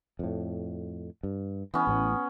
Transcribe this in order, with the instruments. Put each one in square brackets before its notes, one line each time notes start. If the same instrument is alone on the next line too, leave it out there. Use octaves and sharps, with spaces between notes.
[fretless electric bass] F2 A2
G2
[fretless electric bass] E3 [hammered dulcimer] B3 C#4
[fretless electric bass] A1 A2